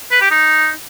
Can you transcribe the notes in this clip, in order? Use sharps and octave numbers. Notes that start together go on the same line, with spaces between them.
B4
G4
D#4